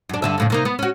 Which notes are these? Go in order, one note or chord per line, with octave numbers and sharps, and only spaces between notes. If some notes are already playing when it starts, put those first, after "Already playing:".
F#2 D4
G2 D3 E5
F2 A2 C#3
C3 A#3 D#4
B3
C#4 F#4